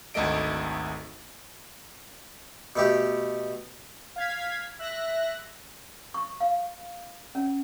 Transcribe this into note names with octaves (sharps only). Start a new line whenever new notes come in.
G#1 D2 A3 A4 D#5 D7
B2 A3 G4
F5 G#6 B6
E5 F#6 A#6
C#6
F5
C#4